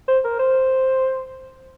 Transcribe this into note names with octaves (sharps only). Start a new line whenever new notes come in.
C5
A#4
C5